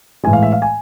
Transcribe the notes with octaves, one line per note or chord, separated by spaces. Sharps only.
A2 E3 G#3 G#5
F5
E5
F5
G#5